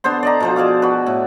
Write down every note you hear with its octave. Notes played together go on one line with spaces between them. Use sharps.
D3 B3 C5 C6
D5 D#5 A#5
B2 F3 C5
G#4 D5 F5 D6
F#4 B4
A2